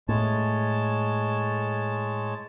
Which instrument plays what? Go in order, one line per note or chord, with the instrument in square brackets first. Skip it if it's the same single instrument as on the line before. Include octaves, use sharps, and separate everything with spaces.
[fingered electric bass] A2 [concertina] G#3 C#5 A5